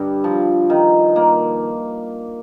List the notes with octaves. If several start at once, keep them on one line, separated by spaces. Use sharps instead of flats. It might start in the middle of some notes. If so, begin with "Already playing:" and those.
Already playing: G2 D3 G3
F3
D#3
A#3